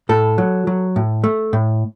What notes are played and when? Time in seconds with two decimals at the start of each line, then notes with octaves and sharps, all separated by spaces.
0.09 A2 A4
0.38 F#3
0.67 F#3
0.96 A2
1.24 A3
1.53 A2